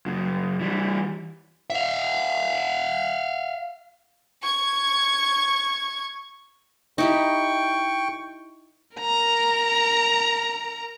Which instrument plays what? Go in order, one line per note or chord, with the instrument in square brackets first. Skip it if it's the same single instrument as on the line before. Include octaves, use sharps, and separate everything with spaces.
[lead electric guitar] F#2 C#3
E3 G3
E5 F5
[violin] C#6 G#6
[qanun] D#4 E4 G4 [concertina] G5 C#6
[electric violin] A#4 A#5